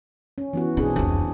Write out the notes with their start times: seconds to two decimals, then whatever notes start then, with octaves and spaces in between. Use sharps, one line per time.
0.38 C#4
0.53 E3 B3 F#4
0.77 B2 C4 D4 G#4
0.96 F1 C#2